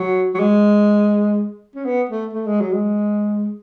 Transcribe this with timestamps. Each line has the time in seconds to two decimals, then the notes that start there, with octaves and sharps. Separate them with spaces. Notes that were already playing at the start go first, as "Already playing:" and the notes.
Already playing: F#3
0.35 F#3
0.40 G#3
1.75 C#4
1.85 B3
2.09 A3
2.33 A3
2.47 G#3
2.61 F#3
2.73 G#3